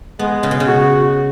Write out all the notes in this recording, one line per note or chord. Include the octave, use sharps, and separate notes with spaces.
G#3 B3
C#3
B2
C#3
F#4